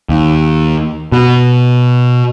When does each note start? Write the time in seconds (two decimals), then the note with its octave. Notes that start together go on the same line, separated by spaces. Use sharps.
0.09 D#2
1.12 B2